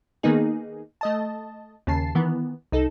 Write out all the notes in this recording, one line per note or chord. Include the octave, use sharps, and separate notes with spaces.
D#3 A#3 B3 D#4 G#4
A3 D#5 A5
D#2 C#3 A5 C7
D#3 E3 B3
C2 D#4 A4